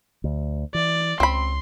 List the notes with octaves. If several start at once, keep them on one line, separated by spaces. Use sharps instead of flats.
D2
E3 D5
C#2 C4 B5 C6